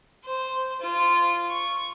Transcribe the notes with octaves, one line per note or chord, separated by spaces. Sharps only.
C5
F4
C#6